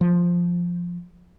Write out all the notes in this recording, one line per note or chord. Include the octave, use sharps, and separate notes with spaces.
F3